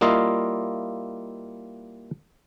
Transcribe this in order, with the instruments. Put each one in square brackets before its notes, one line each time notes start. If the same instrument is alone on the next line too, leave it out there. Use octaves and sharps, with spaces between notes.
[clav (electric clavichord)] G3 A#3 E4 F4 D#5 F5